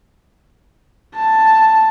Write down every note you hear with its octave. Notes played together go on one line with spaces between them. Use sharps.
A5